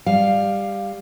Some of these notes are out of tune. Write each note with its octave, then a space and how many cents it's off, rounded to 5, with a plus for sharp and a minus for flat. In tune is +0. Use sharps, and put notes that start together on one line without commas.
G3 +15 F5 +0